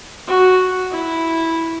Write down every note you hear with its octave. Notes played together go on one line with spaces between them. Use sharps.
F#4
E4